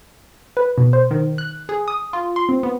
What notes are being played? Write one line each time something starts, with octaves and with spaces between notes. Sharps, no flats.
B4
B2
C5
D#3
F#6
G#4
D#6
F4
C6
C4
B3